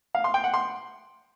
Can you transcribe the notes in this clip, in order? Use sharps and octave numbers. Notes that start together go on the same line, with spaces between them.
F5
C6
G5
F#5
C6